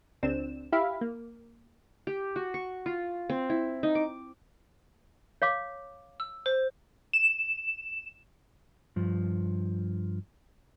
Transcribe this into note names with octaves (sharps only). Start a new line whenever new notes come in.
C#2 C4 D4 E7
E4 G4 E5 F5 B5
A#3
G4
F#4
C#6
F4
C4
E4
D#4
D6
C#5 F5 D6
E6
C5
E7
G2 F3